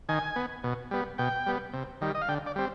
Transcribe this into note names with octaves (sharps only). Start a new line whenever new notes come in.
D#3 G#5
B3
B2
G3 B3
B2 G5
G3 B3
C3
D#3 G3
D#5
F5
D3 G5
D5
G3 C4